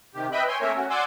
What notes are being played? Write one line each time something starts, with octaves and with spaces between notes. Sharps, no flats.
C3 D#3 G4
B4 D#5 E5 G5 B5
C#5 G5 G#5 C6
A3 A#3 C#4 A#4 C#5 E5
C#4 F#4
D5 F#5 G#5 C6 D6 E6